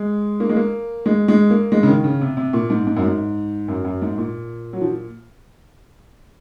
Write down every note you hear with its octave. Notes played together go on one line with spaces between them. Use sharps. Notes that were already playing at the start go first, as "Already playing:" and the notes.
Already playing: G#3
A#3
G#3
A#3
G#3
G#3
A#3
G#3
C#3
D#3
C#3
C3
C3
A#2
G#2
G#2
F#2
G#2
F#2
F#2
G#2
A#2
F#3
F3